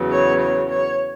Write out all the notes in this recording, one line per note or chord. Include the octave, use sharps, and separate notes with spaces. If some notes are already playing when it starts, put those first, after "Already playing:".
Already playing: E2 C#3 F#3
C#5
C#5
C#5